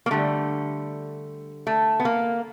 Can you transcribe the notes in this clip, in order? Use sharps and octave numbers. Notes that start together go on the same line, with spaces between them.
A#3
D3 G3 A3
A3
B3
A#3